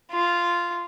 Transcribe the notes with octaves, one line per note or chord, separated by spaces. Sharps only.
F4